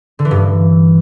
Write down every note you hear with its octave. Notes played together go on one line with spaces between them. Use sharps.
D3
E3
G2